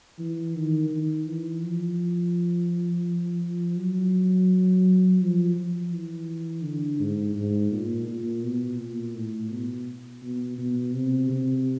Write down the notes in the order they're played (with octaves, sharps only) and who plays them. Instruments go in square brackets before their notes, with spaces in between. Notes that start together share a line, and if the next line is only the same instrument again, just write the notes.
[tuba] E3
D#3
D#3
E3
F3
F#3
F3
F3
E3
D3
G#2
G#2
A#2
A#2
B2
A#2
A2
B2
B2
B2
C3
C3